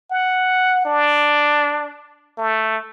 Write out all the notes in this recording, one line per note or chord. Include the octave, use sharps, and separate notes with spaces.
F#5
D4
A3